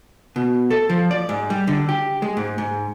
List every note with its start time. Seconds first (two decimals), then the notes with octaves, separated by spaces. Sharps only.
0.36 B2
0.70 A4
0.89 F3
1.11 D5
1.29 G#2
1.50 G3
1.67 D3
1.89 G4
2.22 G#3
2.37 G#2
2.58 G#2